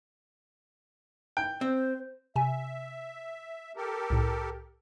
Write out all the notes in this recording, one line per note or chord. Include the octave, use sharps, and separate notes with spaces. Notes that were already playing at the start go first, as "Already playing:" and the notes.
G5
C4 C5
C3 E5 G#5
G4 A4 A#4
C2 A2